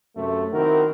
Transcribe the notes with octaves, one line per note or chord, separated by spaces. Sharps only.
F#2 C3 A3
D#3 C4 E4 F#4 A#4